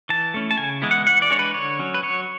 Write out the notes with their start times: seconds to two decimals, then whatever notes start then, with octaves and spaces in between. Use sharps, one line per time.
0.09 E3 A5
0.34 A3 C#4 E4
0.51 A5
0.58 C#3 G#5
0.82 E3 G#3 B3 E4
0.91 F#5
1.07 E3 F#5
1.22 D5
1.30 G#3 D4 C#5
1.39 B4
1.54 D3 C#5
1.79 F#3 C#4
1.94 B4
2.03 F#3 C#5